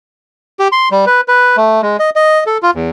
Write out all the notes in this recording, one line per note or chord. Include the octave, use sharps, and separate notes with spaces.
G4
C6
G3
B4
B4
A3
G#3
D#5
D#5
A4
F4
E2